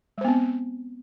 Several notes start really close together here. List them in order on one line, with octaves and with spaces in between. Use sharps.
G#3 C5 B3 C4